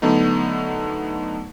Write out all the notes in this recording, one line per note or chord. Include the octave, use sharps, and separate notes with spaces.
D3 F#3 A3 B3 D#4